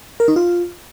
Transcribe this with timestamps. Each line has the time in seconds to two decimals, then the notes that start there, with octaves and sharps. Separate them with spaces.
0.20 A#4
0.28 D#4
0.36 F4